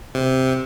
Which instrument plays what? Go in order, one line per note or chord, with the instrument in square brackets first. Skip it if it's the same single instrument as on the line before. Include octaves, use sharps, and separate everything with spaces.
[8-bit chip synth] C3